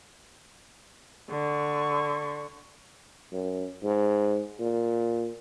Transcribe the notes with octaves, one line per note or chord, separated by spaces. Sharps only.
D3 C#6
F#2
G#2
A#2